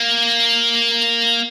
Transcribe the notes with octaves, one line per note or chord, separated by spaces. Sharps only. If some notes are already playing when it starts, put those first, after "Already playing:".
Already playing: A#3